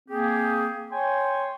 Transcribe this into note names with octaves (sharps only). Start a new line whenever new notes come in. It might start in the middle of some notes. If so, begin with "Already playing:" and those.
A#3 C4 G4 G#4
C#5 G5 G#5 C6